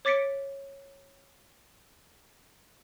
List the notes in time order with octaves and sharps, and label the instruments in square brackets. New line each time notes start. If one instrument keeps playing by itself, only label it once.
[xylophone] C#5 D6 A6 B6 C#7 D7